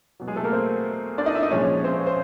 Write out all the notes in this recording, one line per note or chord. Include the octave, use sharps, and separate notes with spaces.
B2 F#3
G#3 G#4
A3 A4
A#3 A#4
C4 C5
D4 D5
D#4 D#5
E4 E5
D#4 D#5
A#2 F3 G#3 C#4 C#5
C4 C5
C5